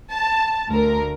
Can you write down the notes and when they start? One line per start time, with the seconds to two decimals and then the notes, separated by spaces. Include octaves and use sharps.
0.13 A5
0.69 D2 A#4